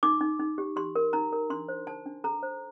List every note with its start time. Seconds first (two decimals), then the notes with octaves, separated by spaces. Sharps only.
0.03 D#4 D6
0.21 D#4
0.40 D#4
0.58 G4
0.76 G4 C6
0.96 A#4
1.13 D#4 A#5
1.32 A#4
1.50 D4 C6
1.68 C5
1.87 C5 A5
2.06 D4
2.24 A4 A#5
2.43 C5